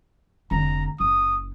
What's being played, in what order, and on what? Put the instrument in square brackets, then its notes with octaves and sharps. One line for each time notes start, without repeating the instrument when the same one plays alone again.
[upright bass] F1 D3 [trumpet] A#5
[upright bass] F#1 [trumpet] D#6